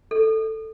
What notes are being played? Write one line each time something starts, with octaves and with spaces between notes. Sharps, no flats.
A4